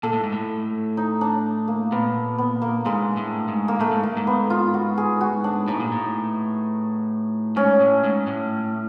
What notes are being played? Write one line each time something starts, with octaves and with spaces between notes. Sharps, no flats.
A#2 A4
A2
G#2
A2
D#4
D4
A#3
A#2 B3
B3
A#3
G#2 G#3
A2
G#2
A#3
A2 A3
G#2
A#3
G#2
B3
F4
F#4
G#4
F#4
D4
A2 D#4
A#2
A2
G#2 C#4
A2
G#2
A2